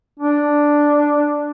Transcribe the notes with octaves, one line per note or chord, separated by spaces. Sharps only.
D4